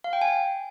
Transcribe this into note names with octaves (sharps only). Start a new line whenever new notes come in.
F5
G5
G#5